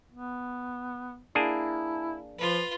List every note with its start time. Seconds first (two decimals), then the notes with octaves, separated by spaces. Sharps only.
0.12 B3
1.35 A#3 D4 E4 G#4
2.38 F3 F4 B4